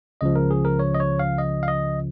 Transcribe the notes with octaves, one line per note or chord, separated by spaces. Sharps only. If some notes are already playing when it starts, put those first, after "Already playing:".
C#2 C#3 F3 D#5
A#4
G#4
A#4
C#5
D#5
C#5
F5
D#5
F5
D#5